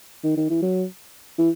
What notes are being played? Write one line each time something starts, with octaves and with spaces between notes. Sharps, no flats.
D#3
D#3
E3
F#3
E3